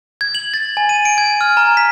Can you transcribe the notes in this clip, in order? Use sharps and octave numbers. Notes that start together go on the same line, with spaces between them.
G#6
F#7
A6
G#5
D#7
D7
G#6
F6
A#5
B6